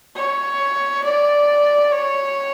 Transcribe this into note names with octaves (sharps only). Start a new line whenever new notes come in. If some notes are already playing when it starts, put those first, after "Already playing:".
C#5
D5
C#5